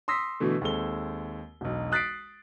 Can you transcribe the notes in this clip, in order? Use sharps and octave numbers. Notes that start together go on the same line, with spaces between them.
C6 D#6 E6 A#6 B6
B2 D3 E3 A3
D#2 G#3 C4 A4 G7
E1 B1
D#6 F#6 A6 B6 C7 D7